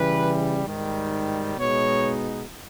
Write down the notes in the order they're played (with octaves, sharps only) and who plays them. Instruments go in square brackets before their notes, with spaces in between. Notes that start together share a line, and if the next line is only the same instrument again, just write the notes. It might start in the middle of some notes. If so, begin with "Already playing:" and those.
Already playing: [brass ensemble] C#3 E3 G3 B4
G#2 D#3 G3
B2 G#3 B3 D#4 C#5